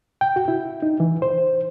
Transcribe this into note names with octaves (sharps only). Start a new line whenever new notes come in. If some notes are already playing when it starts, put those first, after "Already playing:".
G5
F#4
E4
D#4
E3
C5